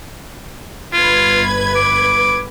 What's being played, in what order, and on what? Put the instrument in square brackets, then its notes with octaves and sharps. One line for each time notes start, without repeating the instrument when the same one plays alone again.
[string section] G1 B4 G#6 [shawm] F4
[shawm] D6